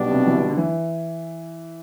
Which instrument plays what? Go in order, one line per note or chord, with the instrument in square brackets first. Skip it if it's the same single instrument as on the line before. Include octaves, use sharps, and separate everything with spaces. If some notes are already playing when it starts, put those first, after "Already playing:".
Already playing: [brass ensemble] B1 B2 G3 B3 D4
[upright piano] C3
E3
D3
D3
E3